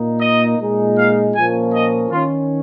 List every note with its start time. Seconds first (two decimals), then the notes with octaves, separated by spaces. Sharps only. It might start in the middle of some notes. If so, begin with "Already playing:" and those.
Already playing: A#2 A#3 D#4
0.21 D#5
0.59 A#2 G#3 D#4
0.97 F5
1.35 A#2 F3 A#3 C#4 G#5
1.74 D#5
2.11 D#3 C#4 F4